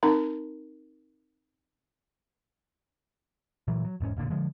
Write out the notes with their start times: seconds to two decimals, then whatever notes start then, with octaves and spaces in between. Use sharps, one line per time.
0.03 C4 D#4 A#4 A#5
3.68 A#2 E3 F#3
3.85 F#3
4.00 E1 G#2 B3 C#4
4.16 F1 A#2 D3
4.30 D3 F3 G#3